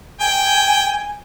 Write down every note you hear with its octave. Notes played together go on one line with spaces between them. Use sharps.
G5 G#5